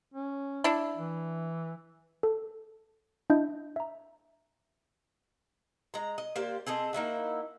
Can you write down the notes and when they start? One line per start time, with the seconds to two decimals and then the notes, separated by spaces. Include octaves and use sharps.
0.14 C#4
0.64 D4 E4
0.97 E3
2.23 A4
3.30 D4 E4 D#5 E5 G6
3.76 E5 A#5
5.94 G#3 A#5
6.18 D#5
6.36 A#3 G4 C5 D5
6.67 C4 G#4 A4 D#5
6.93 A#3 D#4 E4 F#4